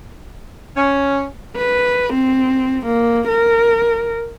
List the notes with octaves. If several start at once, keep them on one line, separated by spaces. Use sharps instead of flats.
C#4
B4
C4
A#3
A#4